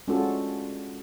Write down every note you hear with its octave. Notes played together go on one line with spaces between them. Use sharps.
G#3 C#4 D4 F4 F#4 A4